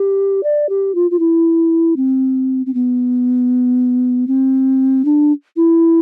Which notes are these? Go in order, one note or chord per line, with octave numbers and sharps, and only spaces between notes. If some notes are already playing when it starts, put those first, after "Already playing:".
Already playing: G4
D5
G4
F4
F4
E4
C4
C4
B3
C4
D4
E4